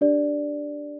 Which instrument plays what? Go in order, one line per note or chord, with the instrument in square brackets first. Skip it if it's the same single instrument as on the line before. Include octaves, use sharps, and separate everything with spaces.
[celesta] D4 G4 D5